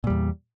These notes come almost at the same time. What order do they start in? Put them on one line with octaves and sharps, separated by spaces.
A#2 G3 E2